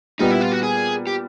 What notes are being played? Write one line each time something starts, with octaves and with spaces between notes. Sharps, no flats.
A#2 G3 B3 D#4
E4
F4
F#4
G#4
G4